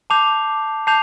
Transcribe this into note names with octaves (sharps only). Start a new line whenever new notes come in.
A5 D6 G6 C7 F7
A5 D6 G6 C7 F7